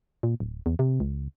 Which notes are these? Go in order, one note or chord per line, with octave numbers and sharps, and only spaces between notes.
A#2
D1
E2
C3
C#2